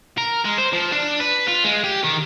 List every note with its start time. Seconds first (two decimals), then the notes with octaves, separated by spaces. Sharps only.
0.18 A#4
0.45 G#3
0.58 C5
0.73 F3
0.92 D4
1.20 B4
1.47 F4
1.64 G#3
1.84 G4
2.04 D#3